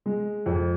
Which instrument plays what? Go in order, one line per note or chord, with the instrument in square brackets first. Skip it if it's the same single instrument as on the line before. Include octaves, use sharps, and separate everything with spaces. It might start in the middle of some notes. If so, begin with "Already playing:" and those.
[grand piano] G#3
F2